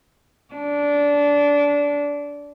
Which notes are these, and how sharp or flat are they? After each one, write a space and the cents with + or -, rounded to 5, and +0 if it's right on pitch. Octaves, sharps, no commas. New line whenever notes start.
D4 -20